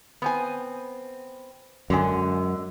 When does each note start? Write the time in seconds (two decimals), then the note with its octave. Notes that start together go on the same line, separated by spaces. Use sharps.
0.22 B3 C4 G#5
1.90 F#2 D3 G#3 G#5